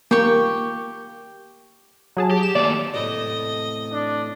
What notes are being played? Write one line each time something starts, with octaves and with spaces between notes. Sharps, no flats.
A#3 G4 G5 C#6
F#3 G#4 A5
G4
E7
D#3 A3 A#3 D5
E2 A2 C3 D#5
D4